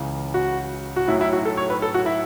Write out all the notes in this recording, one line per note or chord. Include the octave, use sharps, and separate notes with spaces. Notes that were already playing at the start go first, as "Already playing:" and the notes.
Already playing: C#2 C#3 E3
F#4
F#4
B1 A2 F#3 E4
E4
F#4
A4
C#5
B4
A4
F#4
E4